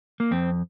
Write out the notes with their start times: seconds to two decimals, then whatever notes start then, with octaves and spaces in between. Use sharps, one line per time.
0.20 A#3
0.31 F2 C4